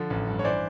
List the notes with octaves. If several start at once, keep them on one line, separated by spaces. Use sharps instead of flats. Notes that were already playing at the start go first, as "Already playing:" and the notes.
Already playing: D3 F3
A1
G2
C#5
E3 C5 D5